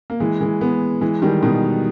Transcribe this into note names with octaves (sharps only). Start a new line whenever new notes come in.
A#3
E3 G#3
E3 G#3
G#3 B3
E3 G#3
D#3 G3
B2 D#3